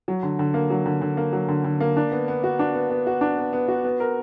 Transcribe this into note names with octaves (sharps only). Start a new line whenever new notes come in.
F#3
D3
D3
A#3
F#3
D3
D3
A#3
F#3
D3
D3
A#3
D4
B3
B3
F#4
D4
B3
B3
F#4
D4
B3
B3
F#4
B3
A#4